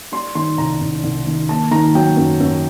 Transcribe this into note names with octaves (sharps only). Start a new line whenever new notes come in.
G3 C6
D#3 C6
C2 A#5
C2
C2
D#3
A#3 A5
D#3 A#5
F#3 G5
F#2
F#2